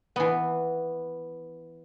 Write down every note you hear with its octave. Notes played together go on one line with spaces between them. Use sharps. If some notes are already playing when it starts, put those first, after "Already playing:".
E3 B3